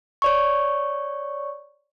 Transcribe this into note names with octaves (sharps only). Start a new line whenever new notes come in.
C#5 D5 C#6